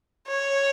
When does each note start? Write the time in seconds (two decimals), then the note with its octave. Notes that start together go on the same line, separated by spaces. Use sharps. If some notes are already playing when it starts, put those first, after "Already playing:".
0.27 C#5